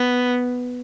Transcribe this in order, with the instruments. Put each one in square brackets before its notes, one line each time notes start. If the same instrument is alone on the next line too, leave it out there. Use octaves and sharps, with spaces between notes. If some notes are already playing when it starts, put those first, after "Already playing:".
Already playing: [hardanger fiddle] B3